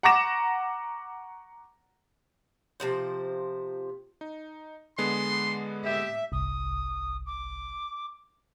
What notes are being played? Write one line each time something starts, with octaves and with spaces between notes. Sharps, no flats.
F#5 A#5 C#6 D6 A#6 E7
C3 F3 C5
D#4
D3 G#3 B3 C6
G4 E5
G1 C2 D#6
D6